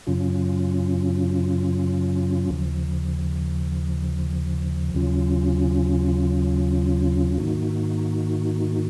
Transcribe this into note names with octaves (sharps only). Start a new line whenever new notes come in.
F#2 C#3 F#3 C#4 F4
D#2 C#3 F3
D#2 C#3 F#3 C#4 F4
G#2 D#3 A#3 D#4 F#4